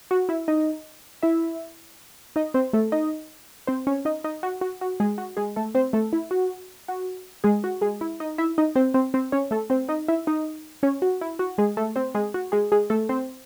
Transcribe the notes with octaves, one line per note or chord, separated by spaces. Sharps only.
F#4
E4 E5
D#4 D#5
E4 E5
D#4 D#5
C4 C5
A3 A4
D#4 D#5
C4 C5
C#4 C#5
D#4 D#5
D#4 D#5
F#4
F#4
F#4
G#3 G#4
F#4
G#3 G#4
A3 A4
C4 C5
A3 A4
E4
F#4
F#4
G#3 G#4
F#4
G#3 G#4
E4
D#4 D#5
E4 E5
D#4 D#5
C4 C5
C4 C5
C4 C5
C#4 C#5
A3 A4
C4 C5
D#4 D#5
E4 E5
D#4 D#5
C#4 C#5
F#4
E4
F#4
G#3 G#4
A3 A4
C4 C5
G#3 G#4
F#4
G#3 G#4
G#3 G#4
A3 A4
C4 C5